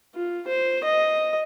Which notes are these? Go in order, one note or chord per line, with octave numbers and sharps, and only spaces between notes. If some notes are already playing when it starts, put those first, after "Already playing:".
F4
C5
D#5